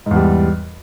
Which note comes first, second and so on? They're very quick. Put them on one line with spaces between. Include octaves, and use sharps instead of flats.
G#2 E2 G3